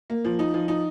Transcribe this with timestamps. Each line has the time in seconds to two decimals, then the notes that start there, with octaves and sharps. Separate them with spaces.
0.10 A#3
0.25 F3
0.39 D#4
0.54 F3
0.68 D#4